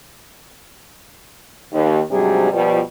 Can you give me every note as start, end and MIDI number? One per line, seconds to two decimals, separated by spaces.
1.72 2.00 39
2.11 2.49 44
2.11 2.49 48
2.11 2.49 54
2.11 2.49 55
2.11 2.49 62
2.11 2.49 68
2.52 2.79 47
2.52 2.79 53
2.52 2.79 55